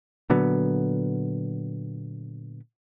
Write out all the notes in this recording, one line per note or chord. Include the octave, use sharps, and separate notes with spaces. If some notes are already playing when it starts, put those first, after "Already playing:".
A#2 D3 F#3 B3